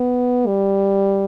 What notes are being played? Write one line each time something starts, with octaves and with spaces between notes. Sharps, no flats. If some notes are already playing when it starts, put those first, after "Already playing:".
Already playing: B3
G3